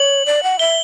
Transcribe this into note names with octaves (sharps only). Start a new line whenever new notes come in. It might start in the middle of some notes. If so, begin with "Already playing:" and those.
Already playing: C#5 F#7
D5
F#5
E5 G7